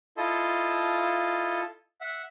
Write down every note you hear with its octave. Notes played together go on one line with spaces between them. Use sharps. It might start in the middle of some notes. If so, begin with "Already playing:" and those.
E4 F4 A4 D#5 A5 C6
E5 F#5